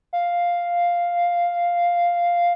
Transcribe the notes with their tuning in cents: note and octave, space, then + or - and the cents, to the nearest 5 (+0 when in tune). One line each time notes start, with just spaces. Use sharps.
F5 +0